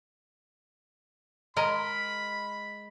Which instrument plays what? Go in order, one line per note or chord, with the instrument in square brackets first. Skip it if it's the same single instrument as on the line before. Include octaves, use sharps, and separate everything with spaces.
[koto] G#3 A#4 D#5 [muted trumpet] B5